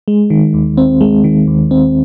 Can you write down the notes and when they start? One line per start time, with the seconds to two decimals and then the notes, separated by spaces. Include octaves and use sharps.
0.08 G#3
0.30 D#3
0.54 D#2
0.77 C4
1.01 G#3
1.24 D#3
1.47 D#2
1.71 C4